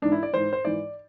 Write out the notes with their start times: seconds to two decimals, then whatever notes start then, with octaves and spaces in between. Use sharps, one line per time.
0.02 G#2 E3 D4
0.12 E4
0.23 D5
0.33 G#2 E3 C5
0.53 C5
0.65 G#2 E3 D5